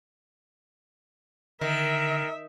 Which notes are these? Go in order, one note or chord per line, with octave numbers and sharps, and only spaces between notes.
D3 D#3 A#4 E5